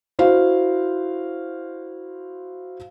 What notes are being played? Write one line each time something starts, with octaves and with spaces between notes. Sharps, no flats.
E4 F#4 C5 F5